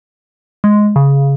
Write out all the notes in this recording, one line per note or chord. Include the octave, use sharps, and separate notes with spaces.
G#3
C#3